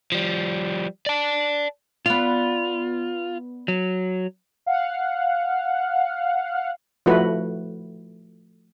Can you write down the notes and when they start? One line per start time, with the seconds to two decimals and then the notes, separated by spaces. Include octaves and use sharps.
0.12 F3 G3
1.06 D5 A5
2.06 B3 F4 D5
3.68 F#3
4.66 F5 F#5
7.06 F3 A3 E4 F#4 B4